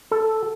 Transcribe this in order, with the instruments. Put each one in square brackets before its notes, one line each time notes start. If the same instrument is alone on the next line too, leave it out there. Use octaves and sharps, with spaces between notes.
[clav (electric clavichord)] A4